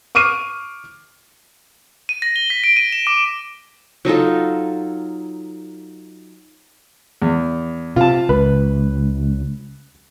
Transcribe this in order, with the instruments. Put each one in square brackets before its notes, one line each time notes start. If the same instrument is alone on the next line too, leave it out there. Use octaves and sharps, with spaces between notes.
[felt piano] C#6 D6 F6 C7 D#7
[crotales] D#7
A#6
G7
B6
D7
D#7
E7
D6
[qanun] F#3 D#4 F4 A4
[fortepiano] E2
[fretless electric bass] C3 [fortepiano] F4 A5
[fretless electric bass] C#2 [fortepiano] B4